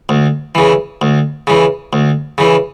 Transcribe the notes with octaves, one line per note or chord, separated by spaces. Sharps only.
D2
C#3 E3
D2
C#3 E3
D2
C#3 E3